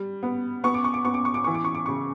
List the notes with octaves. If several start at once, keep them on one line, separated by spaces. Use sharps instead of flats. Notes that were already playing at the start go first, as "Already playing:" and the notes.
Already playing: G3
B3
B3 C#6
D6
C#6
D6
B3 C#6
D6
C#6
D6
E3 C#6
D6
C#6
D6
C#3 C#6